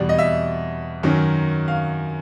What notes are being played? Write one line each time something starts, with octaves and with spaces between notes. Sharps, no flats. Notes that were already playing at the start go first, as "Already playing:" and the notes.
Already playing: E2 B2 G3 D5
D#5
E5
F#2 D#3 F#3
F5